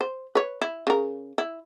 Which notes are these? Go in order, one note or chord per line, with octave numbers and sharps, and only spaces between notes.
C5
B4 C#5
E4
C#3 A#4
E4